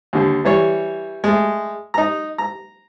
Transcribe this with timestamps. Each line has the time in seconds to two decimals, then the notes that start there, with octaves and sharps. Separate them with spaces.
0.13 D#2 D3
0.45 E3 G3 C#5
1.24 G#3 A3
1.94 D#4 A#5
2.38 A#5